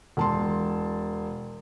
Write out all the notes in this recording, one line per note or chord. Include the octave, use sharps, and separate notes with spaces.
E1 A5 C6